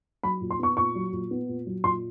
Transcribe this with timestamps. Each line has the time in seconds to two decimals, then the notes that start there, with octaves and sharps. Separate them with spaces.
0.23 F#3 B5
0.41 A#2
0.51 C6
0.59 B3 C#6
0.77 A#2 C#6
0.95 F#3
1.13 A#2
1.31 B3
1.49 A#2
1.66 F#3
1.84 A#2 C6